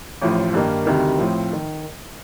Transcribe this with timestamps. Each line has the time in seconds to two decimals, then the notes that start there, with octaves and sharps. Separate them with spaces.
0.21 A1 A2 F3
0.54 G2 D#3 A#3 D#4
0.87 D2 C3 D#3 G3
1.18 A2 F3 C4
1.53 D#3